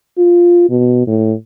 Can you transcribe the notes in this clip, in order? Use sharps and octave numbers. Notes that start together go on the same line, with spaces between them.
F4
B2
A2